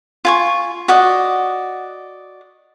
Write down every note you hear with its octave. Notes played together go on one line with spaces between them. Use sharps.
F4 G#5 C#6
F#4 D5 D#5